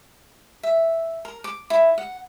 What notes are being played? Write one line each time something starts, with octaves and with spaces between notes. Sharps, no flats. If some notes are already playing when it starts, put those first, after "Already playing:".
E5
A#4
D6
E4
F#5